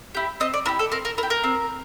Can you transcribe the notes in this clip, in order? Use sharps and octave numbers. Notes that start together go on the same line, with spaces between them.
E4 G4
C4 D#5
D5
E4 G4 A#4
A4
C4 A#4
A#4
E4 A#4
G4
A#4
C4